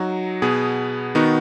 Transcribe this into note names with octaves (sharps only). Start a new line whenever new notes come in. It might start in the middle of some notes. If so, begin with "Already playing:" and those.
Already playing: F#3 D#4 F#4
B2 B3 G#4
D#3 B3 D#4 F#4